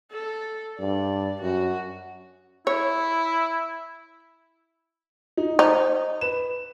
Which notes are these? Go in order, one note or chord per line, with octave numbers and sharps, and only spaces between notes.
A4
G2 D5
F#2 F#4
E4 C#5
D#4
D#4 C5
B4 E7